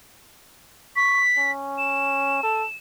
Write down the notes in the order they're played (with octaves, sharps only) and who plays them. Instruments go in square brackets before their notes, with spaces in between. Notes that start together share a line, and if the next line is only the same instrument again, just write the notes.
[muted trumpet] C#6 [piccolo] B6
[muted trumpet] C#4
[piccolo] E7
[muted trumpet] A4